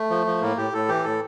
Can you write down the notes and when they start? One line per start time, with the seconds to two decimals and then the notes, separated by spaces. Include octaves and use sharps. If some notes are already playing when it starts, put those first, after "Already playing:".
Already playing: A3
0.10 F3
0.27 F3
0.41 A2 A#3
0.57 A2 G4
0.73 A2 A4
0.88 E3 G4
1.04 A2 A4